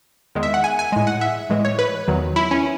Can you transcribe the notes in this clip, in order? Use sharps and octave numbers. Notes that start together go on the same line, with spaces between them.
E2 D#3 G#3
E5
F#5
G#5
G#5
A2 G#3
F#5
E5
A2 E3 G#3
C#5
B4
E2 D#3 F#3
E4
C#4